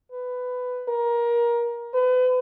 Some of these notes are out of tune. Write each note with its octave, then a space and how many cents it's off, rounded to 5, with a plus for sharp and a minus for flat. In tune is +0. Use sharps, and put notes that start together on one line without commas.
B4 +15
A#4 +20
B4 +35